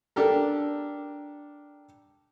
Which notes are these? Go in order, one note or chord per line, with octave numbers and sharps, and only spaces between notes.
D4 G4 A4 A#4